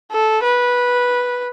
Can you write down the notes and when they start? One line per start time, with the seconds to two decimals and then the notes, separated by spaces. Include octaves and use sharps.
0.11 A4
0.43 B4